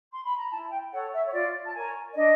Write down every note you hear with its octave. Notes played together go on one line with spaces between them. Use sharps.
C6
B5
A#5
E4 A5
G5
A4 C#5 F#5
E5
C#5
F4 D5
A5
A#4 C#5 G#5
D5
D4 D#5